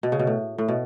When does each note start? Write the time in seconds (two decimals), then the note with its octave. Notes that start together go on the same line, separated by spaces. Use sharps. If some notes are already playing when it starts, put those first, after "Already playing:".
0.03 B2
0.12 C#3
0.19 B2
0.27 A2
0.58 A2
0.68 B2